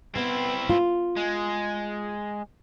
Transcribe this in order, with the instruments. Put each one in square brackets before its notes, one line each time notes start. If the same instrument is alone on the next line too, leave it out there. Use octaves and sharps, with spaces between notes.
[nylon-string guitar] B3 [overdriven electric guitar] C4 E4
[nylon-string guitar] F4
[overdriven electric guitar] G#3